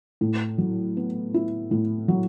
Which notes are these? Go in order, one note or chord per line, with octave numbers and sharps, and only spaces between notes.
A2
F#3
B3
E4
A2
F#3